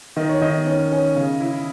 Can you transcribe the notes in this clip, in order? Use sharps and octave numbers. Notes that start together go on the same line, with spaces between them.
D#3 D#5
C#5
D#3 D#5
C#4
C#4
C#3
E4